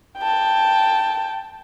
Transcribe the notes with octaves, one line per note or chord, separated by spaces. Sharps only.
G5 A5